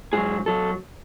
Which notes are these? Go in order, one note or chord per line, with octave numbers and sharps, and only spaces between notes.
G#2 F#3 G#4
F#3 A4